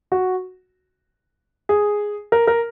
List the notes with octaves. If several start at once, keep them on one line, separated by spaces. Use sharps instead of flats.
F#4
G#4
A#4
A#4